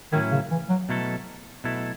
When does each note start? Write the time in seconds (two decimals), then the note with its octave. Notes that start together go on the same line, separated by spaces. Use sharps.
0.13 A2 D#3 F#3 C#4 E4
0.32 C#3
0.51 E3
0.69 F#3
0.89 B2 F#3 A3 E4 A4
1.64 B2 F#3 A3 E4 A4